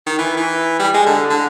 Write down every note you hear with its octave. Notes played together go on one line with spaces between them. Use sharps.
D#3
E3
E3
G3
G#3
D3
D3